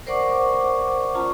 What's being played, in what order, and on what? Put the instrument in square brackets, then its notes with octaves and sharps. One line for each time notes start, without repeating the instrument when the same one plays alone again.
[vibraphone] A#4 C5 D5 F#5 C#6 D6
C#4 F4 A5 A#5 C#6